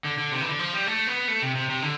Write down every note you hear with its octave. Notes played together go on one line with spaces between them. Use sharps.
D3
D3
C3
E3
D3
F3
G3
A3
B3
A3
C3
C3
C3
D3